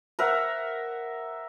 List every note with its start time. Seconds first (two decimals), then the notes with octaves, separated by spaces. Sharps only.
0.19 A#4 E5 F#5